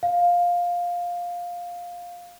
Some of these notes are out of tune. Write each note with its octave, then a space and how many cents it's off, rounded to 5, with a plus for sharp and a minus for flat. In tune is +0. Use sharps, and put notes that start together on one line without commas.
F5 +10